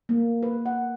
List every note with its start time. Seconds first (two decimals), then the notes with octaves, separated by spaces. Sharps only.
0.09 A#3
0.43 B4
0.66 F#5